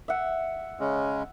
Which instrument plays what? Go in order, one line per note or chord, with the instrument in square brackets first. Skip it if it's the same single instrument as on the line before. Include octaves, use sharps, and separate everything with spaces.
[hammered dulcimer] E5 F#5
[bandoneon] C#3 G#3 C#4